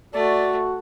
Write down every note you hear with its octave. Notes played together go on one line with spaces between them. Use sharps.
A3 F#4 D5